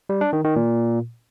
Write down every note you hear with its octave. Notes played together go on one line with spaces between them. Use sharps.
G3
D4
D#3
D#3
A#2